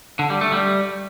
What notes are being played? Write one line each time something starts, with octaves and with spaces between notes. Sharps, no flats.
D3
G3
A3
G3